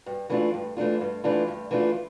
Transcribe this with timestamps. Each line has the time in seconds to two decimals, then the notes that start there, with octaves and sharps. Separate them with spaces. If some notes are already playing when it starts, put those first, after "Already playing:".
0.06 G2
0.30 E3 A3 D4 F4
0.54 G2
0.77 E3 A3 D4 F4
1.01 G2
1.24 E3 A3 D4 F4
1.48 G2
1.71 E3 A3 D4 F4